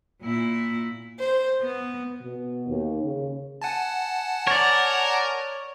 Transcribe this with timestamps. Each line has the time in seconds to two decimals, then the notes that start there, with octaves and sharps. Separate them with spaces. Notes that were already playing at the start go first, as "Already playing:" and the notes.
0.22 A#2 E4
1.20 C5
1.61 B3
2.22 B2
2.68 D#2
3.03 C#3
3.62 F#5 G#5 A5
4.47 A#4 C#5 D5